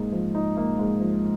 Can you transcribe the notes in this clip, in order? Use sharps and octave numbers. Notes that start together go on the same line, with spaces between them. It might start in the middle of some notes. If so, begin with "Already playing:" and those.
Already playing: G#2 A#3 D#4
F3
D#4
A#3
G#2
F3